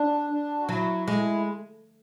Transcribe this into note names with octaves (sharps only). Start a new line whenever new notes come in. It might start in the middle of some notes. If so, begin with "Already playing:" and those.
Already playing: D4
D4
F#4
F#3 E4
G#3 E4